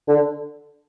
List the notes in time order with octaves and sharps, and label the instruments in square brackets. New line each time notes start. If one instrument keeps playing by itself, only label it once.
[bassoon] D3